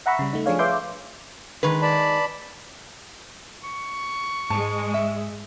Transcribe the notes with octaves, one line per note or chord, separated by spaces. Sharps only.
E5 F#5 A#5 B5 C#6 E6
C#3 G3
A3 D#4
F3 D4 G#4 C#5 F5
B4 E5 F5 C6 D6 G6
D#3 G#3 B4
D5 A5 B5
C#6
G#2 G#3 A5
E5